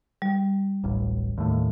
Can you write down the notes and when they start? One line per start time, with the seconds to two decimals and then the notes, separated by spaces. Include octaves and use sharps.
0.22 G3
0.84 D1 A1
1.38 D#2 A2